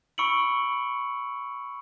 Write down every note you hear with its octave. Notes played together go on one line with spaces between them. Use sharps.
B5 C#6 E6 C#7 D7 F#7